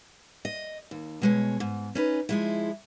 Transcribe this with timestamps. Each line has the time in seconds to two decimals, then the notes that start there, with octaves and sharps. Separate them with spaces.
0.45 D#5
0.91 D#2
1.22 B2 G#3 C#5
1.60 G#2
1.95 C#4 D#4 B4
2.29 F3 G#3 E4